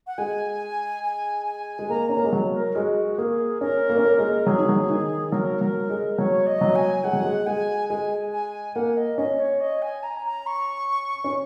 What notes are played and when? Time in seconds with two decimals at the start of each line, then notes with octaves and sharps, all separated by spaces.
0.07 F#5
0.18 G#3 G#5
1.04 G#5
1.46 G#5
1.79 G#3
1.90 A#3 A#5
2.09 C#4 A#5
2.17 A#3
2.25 G#3
2.33 F#3
2.54 A#4
2.75 G#3 F#4
3.18 A#3 G#4
3.61 C#4 A#4
3.89 A#3
3.98 C#4
4.05 A#3
4.18 G#3
4.46 F#3 G#4
4.58 D#3
4.69 F#3
4.89 D#3
5.32 F#3 A#4
5.61 F#3
5.90 G#3
6.18 F#3 C#5
6.47 D#5
6.61 F#3
6.75 G#5
7.04 G#3 F#5
7.13 F#3
7.22 G#3
7.47 G#3 G#5
7.89 G#3 G#5
8.32 G#5
8.76 A#3 F#5
8.97 D#5
9.18 C#4 D#5
9.39 C#5
9.61 D#5
9.82 G#5
10.03 A#5
10.25 A#5
10.47 C#6
11.24 C#4